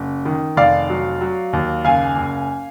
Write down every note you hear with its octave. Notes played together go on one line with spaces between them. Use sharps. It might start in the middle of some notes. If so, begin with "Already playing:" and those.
Already playing: F#1
D#3
F1 D5 F5
F#3
F#3
D#2
F#1 F5 G#5
F#1